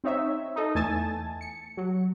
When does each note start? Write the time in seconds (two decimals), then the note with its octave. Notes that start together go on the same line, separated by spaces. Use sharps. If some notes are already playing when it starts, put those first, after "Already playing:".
0.04 C4 D#4 C#5 E5
0.56 D#4 A4 D#5
0.75 E2 A3 G#5 A5 A6
1.41 C#7
1.77 F#3